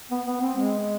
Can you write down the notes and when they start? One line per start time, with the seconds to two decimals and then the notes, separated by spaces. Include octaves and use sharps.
0.11 B3
0.26 B3
0.41 C4
0.57 G#3